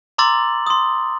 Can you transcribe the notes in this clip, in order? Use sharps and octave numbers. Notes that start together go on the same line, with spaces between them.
A#5 C6 D6 E6 A6 F#7
C6 D#6